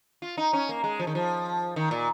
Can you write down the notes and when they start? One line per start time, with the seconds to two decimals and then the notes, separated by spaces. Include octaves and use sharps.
0.22 F4
0.37 D#4
0.53 C#4
0.69 A#3
0.84 G#3
1.00 F3
1.07 D#3
1.15 F3
1.76 D#3
1.91 A#2